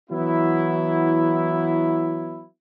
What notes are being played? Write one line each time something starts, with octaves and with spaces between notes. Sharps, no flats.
E3 F#3 B3 E4